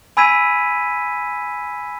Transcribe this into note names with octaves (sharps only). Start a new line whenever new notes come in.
G#5 B5 E6 G#6 B6 D#7